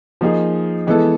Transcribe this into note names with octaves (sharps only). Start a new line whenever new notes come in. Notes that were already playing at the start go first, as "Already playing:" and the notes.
F3 A#3 D#4 G#4
E3 G#3 B3 E4 A4